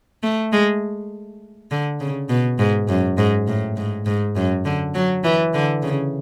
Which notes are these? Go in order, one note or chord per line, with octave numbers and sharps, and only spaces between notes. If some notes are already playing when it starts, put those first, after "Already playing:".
A3
G#3
D3
C#3
B2
G#2
F#2
G#2
A2
G#2
G#2
F#2
D3
F#3
E3
D3
C#3